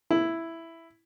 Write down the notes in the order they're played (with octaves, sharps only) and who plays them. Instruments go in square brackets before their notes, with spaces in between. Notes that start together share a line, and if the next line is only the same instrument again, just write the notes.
[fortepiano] E4